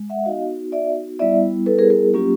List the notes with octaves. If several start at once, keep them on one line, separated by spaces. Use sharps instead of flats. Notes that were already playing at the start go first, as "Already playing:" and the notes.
Already playing: G#3
E5 F#5
B3 D#4 F#4 D#5 F5
D5 E5
G3 B3 E4 D5 E5
A4 B4
G#4 A#4
G#4 A#4
F#3 A#3 C#4 F4 G4